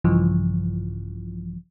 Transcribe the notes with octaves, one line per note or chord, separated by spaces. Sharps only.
A#1 G2 C#3 E3 F3